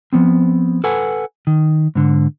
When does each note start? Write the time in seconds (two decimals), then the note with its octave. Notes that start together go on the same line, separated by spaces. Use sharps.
0.13 F3 B3 C4
0.84 A4 B4 F#5 G#5
1.47 D#3
1.95 G#2 D3